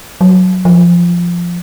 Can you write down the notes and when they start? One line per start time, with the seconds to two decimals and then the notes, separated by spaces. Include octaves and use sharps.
0.21 F#3
0.65 F3